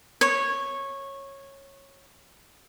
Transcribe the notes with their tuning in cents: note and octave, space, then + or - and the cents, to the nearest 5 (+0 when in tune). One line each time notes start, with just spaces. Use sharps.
C#5 -15